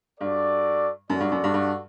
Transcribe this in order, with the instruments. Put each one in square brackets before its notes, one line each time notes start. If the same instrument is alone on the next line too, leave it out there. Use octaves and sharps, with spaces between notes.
[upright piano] G2 [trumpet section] F#4 A4 D5
[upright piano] F#2 [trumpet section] F#4 A4 D5 F#5
[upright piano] G2
F#2
G2
G2